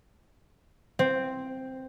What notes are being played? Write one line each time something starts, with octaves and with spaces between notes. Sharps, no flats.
C4